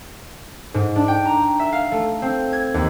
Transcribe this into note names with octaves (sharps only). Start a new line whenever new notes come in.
G#2
D4
G5
A#5
E5
F5
A3
C4
G#6
D#2